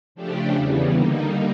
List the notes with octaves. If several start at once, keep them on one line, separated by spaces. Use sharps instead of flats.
C#3 F3 A3 D4 G4
E2 C#3 E3 G3 B3
D3 G3 A#3 D#4